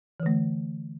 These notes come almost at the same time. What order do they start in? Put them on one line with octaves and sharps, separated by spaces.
E3 D3 A3